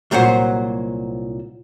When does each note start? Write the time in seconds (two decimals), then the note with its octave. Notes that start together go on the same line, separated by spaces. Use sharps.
0.11 C2 A#2 F#3 C5 F#5